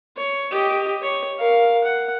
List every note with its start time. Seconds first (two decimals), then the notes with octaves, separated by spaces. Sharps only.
0.17 C#5
0.51 G4 D#5
1.02 C#5
1.39 A#4 F5
1.85 F#5